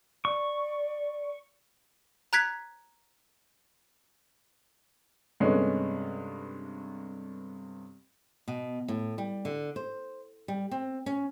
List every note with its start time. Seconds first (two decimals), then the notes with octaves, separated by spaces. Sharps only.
0.25 D5 C#6
2.33 A#5 F#6 G#6 B6
5.40 G2 C3 G#3 A3 B3 C#4
8.48 B2
8.88 A2
9.18 G3
9.45 D3
9.76 C5
10.48 G3
10.71 C4
11.06 C#4